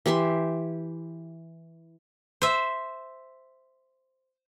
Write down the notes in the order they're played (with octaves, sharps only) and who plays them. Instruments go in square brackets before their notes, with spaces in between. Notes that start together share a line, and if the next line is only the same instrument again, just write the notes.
[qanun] E3 G4 E5 C6
[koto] C5 E5